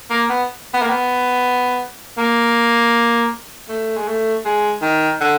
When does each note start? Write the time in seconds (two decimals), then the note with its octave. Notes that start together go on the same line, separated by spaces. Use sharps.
0.11 A#3
0.30 B3
0.74 B3
0.82 A#3
0.90 B3
2.18 A#3
3.69 A3
3.97 G#3
4.08 A3
4.45 G#3
4.82 D#3
5.21 D3